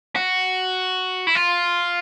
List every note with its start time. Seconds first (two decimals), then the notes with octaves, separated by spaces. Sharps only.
0.16 F#4
1.27 E4
1.35 F4